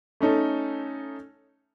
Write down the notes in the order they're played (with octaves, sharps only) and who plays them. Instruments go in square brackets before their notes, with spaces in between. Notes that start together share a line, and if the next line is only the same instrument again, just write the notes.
[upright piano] A3 C#4 D#4 A4